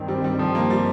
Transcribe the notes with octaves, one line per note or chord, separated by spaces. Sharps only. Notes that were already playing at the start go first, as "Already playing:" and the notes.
Already playing: G2 D#3 C4
G3
G3
F3
A#3
G3